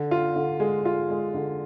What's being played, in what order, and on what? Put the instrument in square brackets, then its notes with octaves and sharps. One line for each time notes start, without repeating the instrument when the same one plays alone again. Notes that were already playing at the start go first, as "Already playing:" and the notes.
Already playing: [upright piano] D3
F4
D3
G#3
F4
G#3
D3